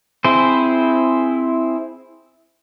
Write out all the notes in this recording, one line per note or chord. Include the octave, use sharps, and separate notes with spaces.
C4 E4 G#4 C5